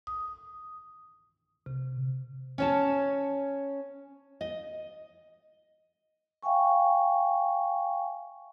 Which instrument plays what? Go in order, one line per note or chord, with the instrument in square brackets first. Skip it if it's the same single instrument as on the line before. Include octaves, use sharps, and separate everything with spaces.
[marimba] D#6
C3
[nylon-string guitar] C#4 C#5 A5
D#5
[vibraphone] E5 F5 G5 G#5 C#6